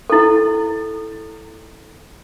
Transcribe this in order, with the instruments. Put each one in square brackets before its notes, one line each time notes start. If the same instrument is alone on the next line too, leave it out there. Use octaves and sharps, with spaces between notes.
[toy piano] E4 A4